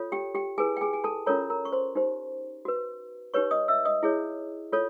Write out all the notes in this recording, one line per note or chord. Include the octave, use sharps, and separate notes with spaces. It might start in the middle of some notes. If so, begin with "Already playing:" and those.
Already playing: F4 A4 C#5
G4 G5
G4 G5
E4 G#4 B4 G#5
G5
G#4 G#5
G#5
A4 A5
C#4 F4 A4 A#4 C#5 A#5
A#4 A#5
C#6
C5 C6
D#4 G4 C5
F#4 B4
D#4 G4 B4 C#5 C#6
D#5 D#6
E5 E6
D#5 D#6
E4 G#4 C#5
F4 A4 C#5